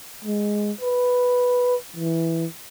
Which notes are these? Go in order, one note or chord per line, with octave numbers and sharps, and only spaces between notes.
G#3
B4
E3